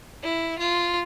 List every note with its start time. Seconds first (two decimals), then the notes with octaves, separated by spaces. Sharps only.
0.23 E4
0.59 F4